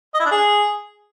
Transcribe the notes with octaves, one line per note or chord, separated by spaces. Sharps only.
D#5
E4
D4
G#4